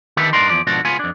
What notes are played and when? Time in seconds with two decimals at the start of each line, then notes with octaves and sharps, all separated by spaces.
0.17 D3 D#3 G4 A4 B4 E5
0.33 G2 D4 D#4 A#4 C6
0.49 E2 G2 F3 D5
0.67 G#2 B2 D3 F3 D4 F#4
0.85 C#2 B3 F4 G#5
0.99 F2 D4